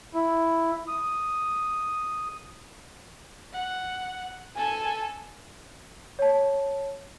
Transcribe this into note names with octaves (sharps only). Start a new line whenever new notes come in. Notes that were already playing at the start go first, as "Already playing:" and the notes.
E4
D#6
F#5
A4 G#5
C#5 A5